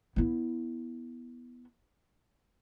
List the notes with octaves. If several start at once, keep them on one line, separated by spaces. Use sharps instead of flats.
B3 E4